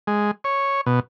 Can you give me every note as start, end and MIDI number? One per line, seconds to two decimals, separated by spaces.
0.07 0.31 56
0.44 0.81 73
0.86 1.00 47